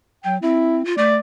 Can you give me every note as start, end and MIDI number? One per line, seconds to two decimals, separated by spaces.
0.24 0.38 54
0.24 0.36 79
0.42 0.85 60
0.42 0.81 64
0.85 0.94 65
0.98 1.18 57
0.98 1.18 74